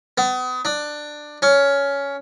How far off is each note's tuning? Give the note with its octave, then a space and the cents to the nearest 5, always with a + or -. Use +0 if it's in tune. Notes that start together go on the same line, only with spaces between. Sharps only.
B3 +35
D4 +15
C#4 +15